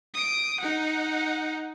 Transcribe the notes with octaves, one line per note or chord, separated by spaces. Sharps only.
D#6 D7
D#4 F#5